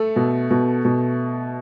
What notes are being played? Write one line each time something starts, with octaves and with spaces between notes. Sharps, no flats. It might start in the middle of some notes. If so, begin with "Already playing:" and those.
Already playing: A3 A4
B2
B2
B2